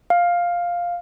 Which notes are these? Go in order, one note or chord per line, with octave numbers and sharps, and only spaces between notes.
F5